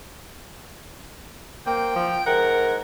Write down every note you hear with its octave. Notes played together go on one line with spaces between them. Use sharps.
A#3 C4 G5
F3
G#2 A#4 F#5